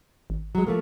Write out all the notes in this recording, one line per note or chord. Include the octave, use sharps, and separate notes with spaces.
G#1
F#3 G#3
F3 A3 A#3